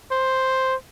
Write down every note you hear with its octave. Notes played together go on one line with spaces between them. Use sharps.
C5